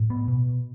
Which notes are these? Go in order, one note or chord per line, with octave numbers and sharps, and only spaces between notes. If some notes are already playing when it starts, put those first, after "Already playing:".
Already playing: A2
B3
B2